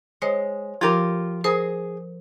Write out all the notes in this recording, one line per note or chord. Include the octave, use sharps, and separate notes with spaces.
G#3 C5 C#5
F3 F4 G4 A#4
G#4 A#4 C5